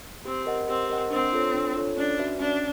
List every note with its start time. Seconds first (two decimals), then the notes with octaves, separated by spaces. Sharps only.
0.25 C4 G4
0.46 A#4 D#5 F#5
0.68 C4 G4
0.89 A#4 D#5 F#5
1.11 C4 D4
1.33 F4 A4 C#5
1.54 D4
1.76 F4 A4 C#5
1.97 C#4 D4
2.18 F#4 B4 E5
2.40 C#4 D4